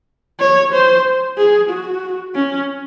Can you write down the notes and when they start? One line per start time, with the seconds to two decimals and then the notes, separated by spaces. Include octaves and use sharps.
0.40 C#5
0.73 C5
1.38 G#4
1.70 F#4
2.35 C#4